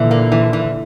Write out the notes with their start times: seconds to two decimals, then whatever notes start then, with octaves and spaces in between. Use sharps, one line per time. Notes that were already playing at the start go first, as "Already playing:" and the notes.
Already playing: A#2 D3 E3
0.11 A#3
0.32 E3
0.53 E3